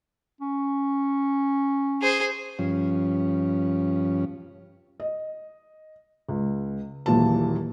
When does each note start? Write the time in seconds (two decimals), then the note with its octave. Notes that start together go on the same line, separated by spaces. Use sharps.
0.41 C#4
2.02 G#4 C5
2.59 G2 F3 C#4
5.00 D#5
6.29 C#2
7.06 D#1 A#2 E3 F#3 A5